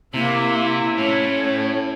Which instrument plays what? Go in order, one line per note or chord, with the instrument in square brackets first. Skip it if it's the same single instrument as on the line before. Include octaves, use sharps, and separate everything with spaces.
[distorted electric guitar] C3 [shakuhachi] A#3 [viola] E4 E5
[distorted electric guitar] A2 [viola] A3 C#4 [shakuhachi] C#5